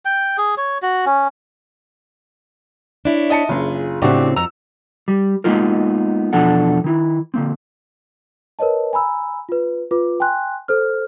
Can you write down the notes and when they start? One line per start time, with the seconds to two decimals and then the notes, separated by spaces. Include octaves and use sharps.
0.05 G5
0.38 G#4
0.57 C#5
0.82 F#4
1.06 C#4
3.05 D4 E4 C#5
3.30 D#5 A5 C#7
3.49 F#1 F4 G#4
4.02 A2 C#3 C4 D4 F#4 G4
4.36 F2 F#4 A#5 E6
5.08 G3
5.44 G#3 A#3 B3 D#4 F4 A#4
6.33 E2 B2 F3 D4 A4 F#5
6.84 D#3 E4
7.34 D3 A#3 C4
8.59 A#4 B4 C#5 D#5 A5
8.93 G#5 A#5 B5 E6
9.49 F4 B4
9.91 F4 B4 D6
10.20 G5 G#5 C6 F#6
10.68 A4 C5 F6